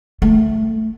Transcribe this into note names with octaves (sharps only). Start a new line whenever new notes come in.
A3